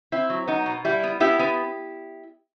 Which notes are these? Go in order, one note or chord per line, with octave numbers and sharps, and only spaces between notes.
C4 E4
F#3
B3 D#4
B2
G3 E4
B3
B3 E4 G4
B3